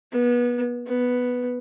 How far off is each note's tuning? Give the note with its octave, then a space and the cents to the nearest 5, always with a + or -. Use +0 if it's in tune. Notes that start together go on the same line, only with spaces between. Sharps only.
B3 -25
B3 +0